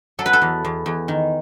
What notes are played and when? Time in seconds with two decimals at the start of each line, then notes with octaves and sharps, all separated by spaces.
0.19 F#3 A4
0.26 B4
0.33 A4
0.42 E2
0.65 E2
0.86 E2
1.08 D#3